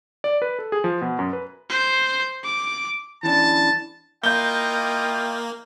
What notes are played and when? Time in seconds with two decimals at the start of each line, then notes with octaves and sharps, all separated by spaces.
0.24 D5
0.42 B4
0.59 A4
0.72 G#4
0.84 F3
1.01 B2
1.19 F#2
1.33 B4
1.70 C5
2.44 D6
3.23 E3 C#4 D4 A5
4.24 A#3 E4 F4 D#5 G5 G6 G7